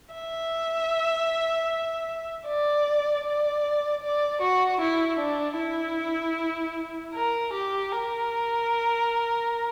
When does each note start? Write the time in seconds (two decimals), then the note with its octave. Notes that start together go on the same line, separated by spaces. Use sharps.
0.14 E5
2.47 D5
3.25 D5
4.03 D5
4.42 F#4
4.81 E4
5.19 D4
5.58 E4
7.14 A#4
7.53 G4
7.92 A#4